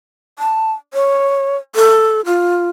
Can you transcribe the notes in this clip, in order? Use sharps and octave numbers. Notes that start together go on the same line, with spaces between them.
A5
C#5
A4
F4